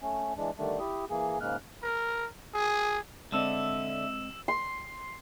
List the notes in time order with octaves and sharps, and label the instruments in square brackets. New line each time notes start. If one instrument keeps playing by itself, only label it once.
[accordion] A3 C#4
E3 G#3 D4
D3 D#3 G3 A3 D4
E4 G4 D#6
E3 A#3 G#4
G#2 C#3 G#3 A#3 F6 F#6
[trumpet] A#4
G#4
[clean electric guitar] D3 [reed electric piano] G#3 C4 D#5 [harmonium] E5 [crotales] E6 E7
[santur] C6